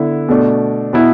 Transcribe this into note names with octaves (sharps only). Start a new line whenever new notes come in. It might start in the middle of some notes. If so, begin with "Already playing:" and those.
Already playing: D3 B3 E4
B2 A3 D4
B2 B3 E4